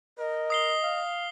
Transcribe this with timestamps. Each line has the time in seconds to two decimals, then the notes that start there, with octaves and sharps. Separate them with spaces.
0.18 A#4 D#5
0.50 D#6 C7 G7
0.83 F5